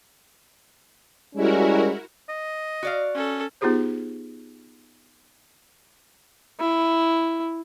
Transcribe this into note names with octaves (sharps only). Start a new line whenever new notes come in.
G3 G#3 C#4 E4 F#4 A#4
D#5
F#4 D5 F5
C#4 A4
B3 D#4 F4 G4 G#4 C5
E4